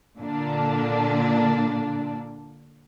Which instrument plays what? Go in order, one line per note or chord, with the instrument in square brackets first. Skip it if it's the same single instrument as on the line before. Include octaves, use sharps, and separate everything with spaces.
[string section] A#2 D3 A#3 D4